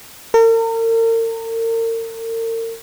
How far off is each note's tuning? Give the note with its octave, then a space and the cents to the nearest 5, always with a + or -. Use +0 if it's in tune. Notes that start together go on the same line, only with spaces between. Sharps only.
A#4 -40